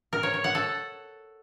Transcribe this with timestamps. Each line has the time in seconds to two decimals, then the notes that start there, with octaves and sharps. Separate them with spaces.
0.13 A#4
0.23 C#5
0.34 C#5
0.44 F#5
0.55 A4